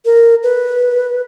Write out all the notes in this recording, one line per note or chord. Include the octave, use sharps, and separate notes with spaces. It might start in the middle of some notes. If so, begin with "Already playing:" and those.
A#4
B4